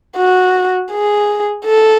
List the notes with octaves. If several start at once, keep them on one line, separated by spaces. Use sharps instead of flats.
F#4
G#4
A4